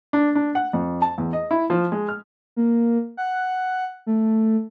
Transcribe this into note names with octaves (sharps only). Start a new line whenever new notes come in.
D4
D4
F#5
F2
A5
E2
D#5
E4
F3
G#3
F6
A#3
F#5
A3